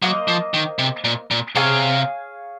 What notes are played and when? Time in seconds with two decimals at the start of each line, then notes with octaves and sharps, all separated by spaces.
0.02 F#3 A#3 F4 C5 D#5
0.28 F3
0.54 D#3
0.79 C3
1.04 A#2
1.31 A#2
1.55 C3 G#4 C#5 F5 G#5